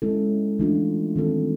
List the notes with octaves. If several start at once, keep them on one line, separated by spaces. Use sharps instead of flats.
G#3 C#4 E4 A4
E3 A3 D4 F4
D#3 G3 C4 F4 A4